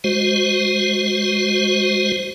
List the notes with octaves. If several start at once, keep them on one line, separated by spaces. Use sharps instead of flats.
G#3 F#4 C5